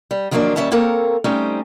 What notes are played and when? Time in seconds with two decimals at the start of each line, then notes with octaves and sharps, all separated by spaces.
0.11 G3
0.31 D#3 F3 F#3 A#3 C#4 D4
0.56 D#2 G3 A3 C#4 E5 A5
0.71 A#3 C4 A4 A#4 C#5
1.24 G3 A3 C4 C#4 D#4